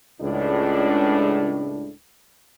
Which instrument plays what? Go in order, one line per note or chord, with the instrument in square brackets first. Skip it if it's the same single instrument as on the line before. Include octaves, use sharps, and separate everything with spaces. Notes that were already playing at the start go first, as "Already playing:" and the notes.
[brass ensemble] C#2 A2 D4